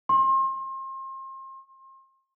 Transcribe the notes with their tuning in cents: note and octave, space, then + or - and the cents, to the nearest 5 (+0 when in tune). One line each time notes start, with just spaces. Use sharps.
C6 +35